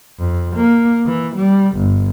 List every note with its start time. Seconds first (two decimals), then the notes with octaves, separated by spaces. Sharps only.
0.19 F2
0.56 A#3
1.06 E3
1.36 G3
1.77 G1